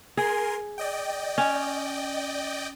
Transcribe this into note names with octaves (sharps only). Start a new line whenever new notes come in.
G#4 A#4 G#5 C6
D5 D#5 G5
C#4